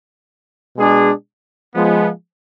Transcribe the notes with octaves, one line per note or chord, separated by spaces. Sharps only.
B2 G#3 D4 G#4
F3 G#3 B3